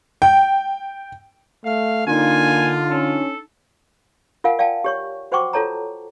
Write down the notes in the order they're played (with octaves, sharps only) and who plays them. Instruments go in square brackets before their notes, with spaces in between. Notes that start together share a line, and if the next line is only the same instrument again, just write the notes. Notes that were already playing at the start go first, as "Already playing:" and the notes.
[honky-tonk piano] G5
[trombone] A3 [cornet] F5
[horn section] D3 F4 [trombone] A#3 [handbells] D4 D#4 [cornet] G#5
[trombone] C#4 [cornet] A4
[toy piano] F4 A#4 F5 F#5 G#5
D5 F5 G5 A5
G4 C#5 C#6
F#4 C5 F#5 G5 C#6 D6
F4 A4 C#5 A5 A#5